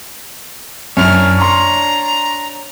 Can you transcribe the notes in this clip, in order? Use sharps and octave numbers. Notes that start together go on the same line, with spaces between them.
F#2 D4 C#5 F6 F7
A#5 C6 C#6